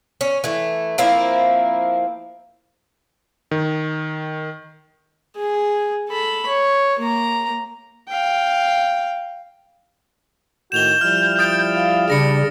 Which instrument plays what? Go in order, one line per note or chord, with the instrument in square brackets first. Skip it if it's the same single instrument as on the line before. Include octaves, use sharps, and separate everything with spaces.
[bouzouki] C#4
E3 A3
F3 A#3 C4 E4
[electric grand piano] D#3
[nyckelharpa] G#4
A4 B5
C#5
A#3 A#5
F5 G5
[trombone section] A2 D#3 F#4 [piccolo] G6 [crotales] E7 F7 G7
[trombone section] F3 G3 E4 [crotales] F6
[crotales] D#6 A6 D7
[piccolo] F5
[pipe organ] C#3 [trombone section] G3 D4 [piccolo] B5 [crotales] A#6 C#7